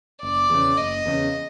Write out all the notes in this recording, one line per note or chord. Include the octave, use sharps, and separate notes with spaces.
F#1 D5
E2 C#3
F#1 D#5
E2 C#3